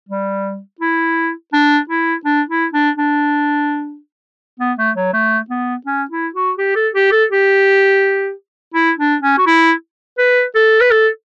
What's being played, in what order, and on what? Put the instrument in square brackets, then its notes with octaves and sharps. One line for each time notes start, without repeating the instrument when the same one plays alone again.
[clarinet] G3
E4
D4
E4
D4
E4
D4
D4
B3
A3
F#3
A3
B3
C#4
E4
F#4
G4
A4
G4
A4
G4
E4
D4
C#4
F#4
E4
B4
A4
B4
A4